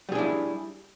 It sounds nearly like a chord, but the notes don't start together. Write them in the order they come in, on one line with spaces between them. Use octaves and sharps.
G3 G#4 D4 E4